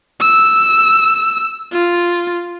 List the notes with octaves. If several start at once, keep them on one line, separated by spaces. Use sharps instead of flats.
E6
F4